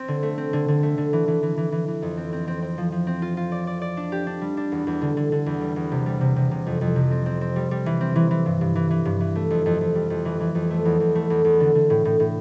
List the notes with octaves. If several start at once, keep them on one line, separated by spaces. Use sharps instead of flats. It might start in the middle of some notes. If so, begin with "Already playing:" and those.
Already playing: C4
D3
A3
C4
D3
D3
A3
D3
E3
E3
E3
E3
E3
E3
F2
C4
C4
C4
C4
F3
F3
C4
F4
F4
D5
D5
D5
D4
G4
D4
G3
D4
E2
E2
D3
D3
D3
E2
G3
E2
C3
G3
C3
C3
C3
F2
F2
C3
C4
C4
C4
G3
G3
E3
C4
E3
E3
G2
G2
E3
E3
G2
E3
A3
F2
F2
F2
G3
F2
E3
E3
F2
A3
E2
E2
A3
E2
E2
D3
D3
A2
A2
A2